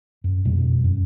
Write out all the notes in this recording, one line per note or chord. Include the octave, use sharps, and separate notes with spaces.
F#2
F2 B2 G3
F#2